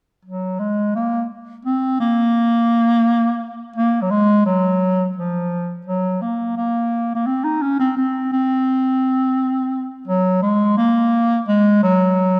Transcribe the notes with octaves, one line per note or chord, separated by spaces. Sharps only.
F#3
G#3
A#3
C4
A#3
A#3
F#3
G#3
F#3
F3
F#3
A#3
A#3
A#3
C4
D#4
C#4
C4
C4
C4
F#3
G#3
A#3
G#3
F#3